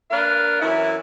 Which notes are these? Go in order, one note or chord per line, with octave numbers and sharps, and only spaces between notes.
A#3 D4 A#4 B4 F5
F#2 E3 E4